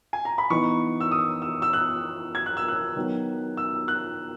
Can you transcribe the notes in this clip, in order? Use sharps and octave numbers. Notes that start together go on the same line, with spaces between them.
G#5
A#5
B5
E3 B3 D#4 C#6
E6
D#6
E6
E6
F#6
G#6
F#6
E6
F#6
D#3 F#3 B3
E6
F#6